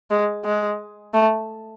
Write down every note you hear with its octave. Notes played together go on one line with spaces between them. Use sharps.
G#3
G#3
A3